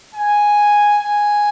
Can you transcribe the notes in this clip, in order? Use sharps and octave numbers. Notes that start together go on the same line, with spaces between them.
G#5
G#5